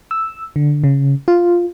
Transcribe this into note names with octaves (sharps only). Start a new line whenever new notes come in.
E6
D3
C#3
F4